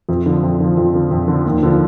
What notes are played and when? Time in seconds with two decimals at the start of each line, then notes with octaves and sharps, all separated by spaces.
0.09 F2
0.26 D3 F3
0.43 F2
0.60 D3 F3
0.77 F2
0.94 D3 F3
1.11 F2
1.28 D3 F3
1.46 D#2
1.63 D3 F3